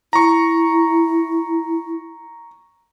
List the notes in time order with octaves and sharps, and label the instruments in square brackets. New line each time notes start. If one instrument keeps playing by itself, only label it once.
[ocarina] E4 [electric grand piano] A#5 C#6